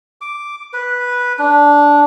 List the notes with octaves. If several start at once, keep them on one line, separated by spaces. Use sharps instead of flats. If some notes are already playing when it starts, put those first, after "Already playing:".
D6
B4
D4